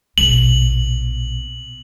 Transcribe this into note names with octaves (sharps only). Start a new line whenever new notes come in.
A#1 B2 F#7